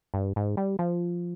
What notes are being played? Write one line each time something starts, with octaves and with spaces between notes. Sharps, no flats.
G2
G#2
G3
F3